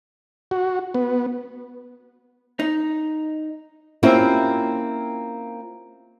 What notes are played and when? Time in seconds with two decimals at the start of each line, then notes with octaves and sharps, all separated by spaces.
0.51 F#4
0.94 B3
2.60 D#4
4.03 A#3 C4 C#4 E4 F4 G4